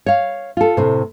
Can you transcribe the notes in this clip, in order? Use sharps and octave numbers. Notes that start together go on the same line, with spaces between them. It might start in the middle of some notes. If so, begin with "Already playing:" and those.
C#5 F5
F4 A4
A2 C3